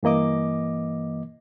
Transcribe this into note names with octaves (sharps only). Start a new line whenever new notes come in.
G2 E3 A#3 D#5 D6